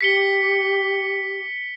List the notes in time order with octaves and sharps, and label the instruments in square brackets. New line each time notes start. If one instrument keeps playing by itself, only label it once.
[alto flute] G4 [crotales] B6 C#7 G7